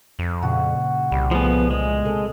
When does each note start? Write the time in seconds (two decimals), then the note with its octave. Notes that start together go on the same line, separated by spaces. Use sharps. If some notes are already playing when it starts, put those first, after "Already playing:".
0.19 F2
0.43 A#2 C#3 C#4 F#4
1.12 C2 G3
1.31 F3 A3 B3 G#4
1.71 G#3
2.05 C3 A4 A#4